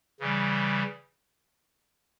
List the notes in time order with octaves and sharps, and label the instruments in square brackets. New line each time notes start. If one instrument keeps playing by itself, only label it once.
[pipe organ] C#3 E3 G3